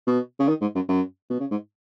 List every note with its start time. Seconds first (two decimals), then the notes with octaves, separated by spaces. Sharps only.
0.07 B2
0.39 C#3
0.48 D#3
0.61 G#2
0.75 F#2
0.89 F#2
1.30 B2
1.40 C#3
1.51 G#2